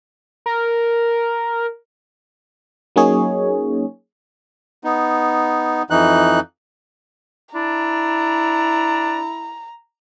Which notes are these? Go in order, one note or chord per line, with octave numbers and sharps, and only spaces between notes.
A#4
F#3 A#3 C#4 D#4 G#4 C#5
B3 D#4
F2 E3 D#4 F#6
D4 E4 A#5